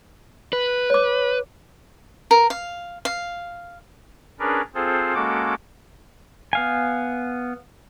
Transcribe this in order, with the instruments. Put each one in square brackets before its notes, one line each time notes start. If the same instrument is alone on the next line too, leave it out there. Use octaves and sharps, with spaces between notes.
[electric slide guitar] B4
[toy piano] C#5 D6
[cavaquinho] A#4
F5
F5
[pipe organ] C#4 D4 G#4 A#4 B4 D5
C4 F4 G#4 A4 C5
G#3 A#3 C#4 F#4 A4 D6
[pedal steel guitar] B3 F5 G#5